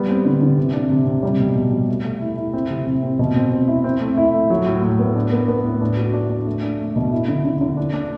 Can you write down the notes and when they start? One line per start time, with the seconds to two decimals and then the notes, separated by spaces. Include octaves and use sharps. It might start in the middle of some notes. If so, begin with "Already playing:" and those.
Already playing: G3 B3
0.08 C4
0.25 D3
0.41 D3
0.58 C3
0.73 D4
0.90 C3
1.07 C3
1.23 G3
1.39 B2
1.55 B2
1.72 G3
1.89 A3
2.05 A3
2.21 E4
2.37 E4
2.54 C4
2.70 C3
2.87 C3
3.03 C4
3.19 B2
3.36 C4
3.52 C4
3.68 E4
3.84 C4
4.01 A3
4.17 E4
4.34 A3
4.50 F#3
4.66 A2
4.83 A2
4.99 B3
5.15 D4
5.32 B3
5.48 B3
5.65 A2
5.81 D4
5.97 F#4
6.13 D4
6.30 D4
6.47 A3
6.63 D4
6.79 A3
6.96 B2
7.12 E4
7.28 D3
7.45 D3
7.61 D3
7.77 D4
7.94 D4